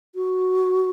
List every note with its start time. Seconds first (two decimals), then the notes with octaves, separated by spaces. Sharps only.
0.15 F#4